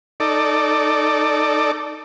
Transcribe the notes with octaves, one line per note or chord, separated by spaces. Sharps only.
D#4 A4 D5